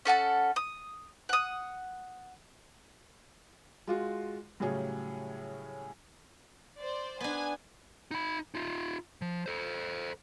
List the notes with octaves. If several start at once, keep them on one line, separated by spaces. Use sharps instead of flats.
C#4 A4 F#5 A5
D#6
F#5 D#6
G#3 F4 F#4
A2 C#3 F#3 G3 C#4 G#4
C5 D5
B3 D4 G#5
D#4 B5
D#4 F4
F3
A4 C5